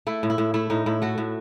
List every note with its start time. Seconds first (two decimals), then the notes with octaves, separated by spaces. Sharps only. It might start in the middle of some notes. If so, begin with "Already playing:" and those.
0.07 A3 E4
0.23 A2
0.30 E4
0.38 A2
0.54 A3 E4
0.70 A2 D#4
0.86 A2 E4
1.02 A3 F#4
1.18 A2